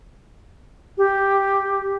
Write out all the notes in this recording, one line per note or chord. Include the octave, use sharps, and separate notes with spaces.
G4